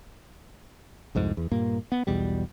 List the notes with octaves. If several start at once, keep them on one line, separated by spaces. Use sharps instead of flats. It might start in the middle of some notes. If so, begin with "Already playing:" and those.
C2 F2 G#2
E2
G2 A#2 A#3
B3
B1 E2 B2 G3